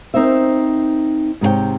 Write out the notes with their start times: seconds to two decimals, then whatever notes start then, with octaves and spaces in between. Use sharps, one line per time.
0.14 C4 D#4 A#4 C5 E5
1.41 G#2 C3 B4 C#5 G5